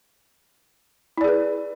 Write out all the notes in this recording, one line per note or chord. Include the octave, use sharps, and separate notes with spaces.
E4 G#4 B4 D5